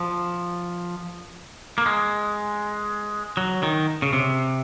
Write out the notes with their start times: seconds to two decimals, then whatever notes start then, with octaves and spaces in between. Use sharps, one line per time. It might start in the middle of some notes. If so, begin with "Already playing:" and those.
Already playing: F3
1.78 A#3
1.86 G#3
3.37 F#3
3.63 D#3
4.02 C#3
4.13 C3